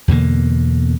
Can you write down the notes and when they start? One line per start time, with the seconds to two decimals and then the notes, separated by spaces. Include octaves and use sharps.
0.08 E2 B2 D3 A#3